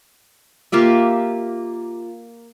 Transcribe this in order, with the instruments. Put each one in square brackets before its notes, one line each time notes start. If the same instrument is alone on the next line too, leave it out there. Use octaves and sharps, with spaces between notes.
[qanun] A#3 F4 G4 E5